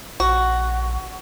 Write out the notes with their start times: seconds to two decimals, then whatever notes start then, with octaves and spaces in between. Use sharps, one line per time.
0.20 A#1 F#4